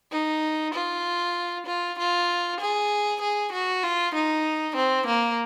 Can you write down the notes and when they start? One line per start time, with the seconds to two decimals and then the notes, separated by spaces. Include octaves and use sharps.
0.12 D#4
0.74 F4
1.67 F4
1.98 F4
2.60 G#4
3.21 G#4
3.53 F#4
3.83 F4
4.14 D#4
4.76 C4
5.07 A#3